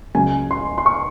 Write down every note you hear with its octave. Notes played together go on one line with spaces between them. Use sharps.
C#2 C#3 F#3 A#3 G#5
C6
C6
C#6